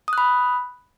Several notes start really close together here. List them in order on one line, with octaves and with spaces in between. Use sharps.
D#6 F#6 B5